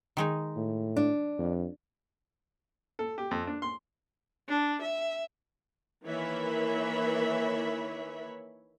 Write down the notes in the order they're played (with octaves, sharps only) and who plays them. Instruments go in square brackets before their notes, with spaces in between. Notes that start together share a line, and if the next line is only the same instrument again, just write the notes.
[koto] D#3 G#3 D#4
[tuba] A2
[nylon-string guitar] D4
[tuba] F2
[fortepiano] A4
G4
F2
D4
C6
[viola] D4
E5
[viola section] D#3 E3 A#3 C#5 E5 B5